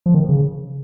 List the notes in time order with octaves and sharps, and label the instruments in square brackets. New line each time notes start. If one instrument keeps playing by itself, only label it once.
[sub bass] F3
D#3
C#3